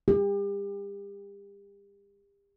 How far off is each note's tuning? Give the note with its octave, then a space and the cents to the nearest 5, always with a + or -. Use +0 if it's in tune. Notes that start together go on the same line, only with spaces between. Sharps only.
G4 +35